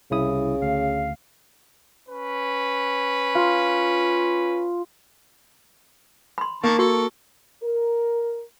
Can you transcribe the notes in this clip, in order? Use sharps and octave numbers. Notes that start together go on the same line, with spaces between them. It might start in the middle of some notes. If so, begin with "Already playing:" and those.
C2 C#3 E4 D#6
D2 F5
C#4 B4
F4
B5 C6
D#3 A#3 A5 C#6
F#4 A4 C#6
A#4